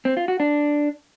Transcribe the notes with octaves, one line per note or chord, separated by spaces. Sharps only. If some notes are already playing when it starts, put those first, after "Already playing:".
C4
F4
F#4
D4